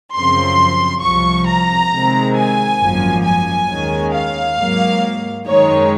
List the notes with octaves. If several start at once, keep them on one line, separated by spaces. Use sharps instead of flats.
F#2 C#3 F3 C4 C6
C2 C3 F3 C#6
A#5
C3 D#3 G#3 C4
G#5
G#1 F#2 F3 A#3
G#5
D#2 D#3 G#3 C#4
F5
G#2 F#3 A#3
F#2 D#3 G#3 D#4 C#5